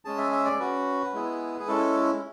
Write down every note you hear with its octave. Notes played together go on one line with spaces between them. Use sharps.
G#3 C#4 G#4 A5
E5
E5
D5
C#4 F#4 B4
G#3 B3 E4 G#4
G#4
G#3 C#4 E4 A4